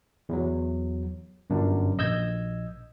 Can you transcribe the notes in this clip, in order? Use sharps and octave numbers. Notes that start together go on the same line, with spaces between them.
E2 F#3
G1 F#2 D4
A#1 D#5 E6 G6 G#6